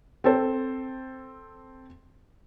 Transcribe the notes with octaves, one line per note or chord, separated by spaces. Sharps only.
C4 A4 C5